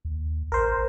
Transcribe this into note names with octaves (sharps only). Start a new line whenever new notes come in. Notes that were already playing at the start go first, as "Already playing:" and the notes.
D#2
A1 A#4 C5